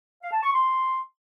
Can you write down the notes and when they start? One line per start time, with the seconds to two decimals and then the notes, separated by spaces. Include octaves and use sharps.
0.22 F5
0.33 A5
0.43 C#6
0.54 C6